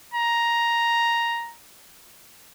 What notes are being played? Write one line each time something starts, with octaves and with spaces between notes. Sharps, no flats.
A#5